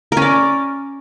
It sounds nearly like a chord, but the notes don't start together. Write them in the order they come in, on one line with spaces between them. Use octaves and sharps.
A#4 C#4 D5